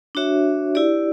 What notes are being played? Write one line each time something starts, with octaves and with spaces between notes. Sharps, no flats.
D4 F#4 C#5 E5
E4 G4 D5